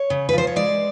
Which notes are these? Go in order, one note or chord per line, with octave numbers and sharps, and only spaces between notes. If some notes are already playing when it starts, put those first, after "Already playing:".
Already playing: C#5
C#3
B4
F3 C5
C#5
G#3 D5